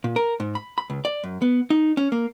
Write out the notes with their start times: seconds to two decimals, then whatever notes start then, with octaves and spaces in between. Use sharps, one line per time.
0.04 A#2
0.16 A#4
0.40 G#2
0.55 B5
0.78 B5
0.90 C#2
1.05 D5
1.24 F#2
1.42 B3
1.70 D#4
1.97 C#4
2.12 A#3